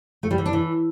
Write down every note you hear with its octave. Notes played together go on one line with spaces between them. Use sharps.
A3
G3
E3
D4
E3